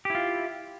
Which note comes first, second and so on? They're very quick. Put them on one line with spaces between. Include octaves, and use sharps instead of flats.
G4 E4 F4